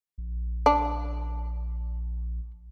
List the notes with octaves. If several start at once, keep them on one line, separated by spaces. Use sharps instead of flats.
A#1
D4